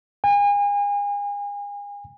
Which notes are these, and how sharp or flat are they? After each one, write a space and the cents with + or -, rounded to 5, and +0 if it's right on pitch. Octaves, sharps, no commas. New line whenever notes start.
G#5 -35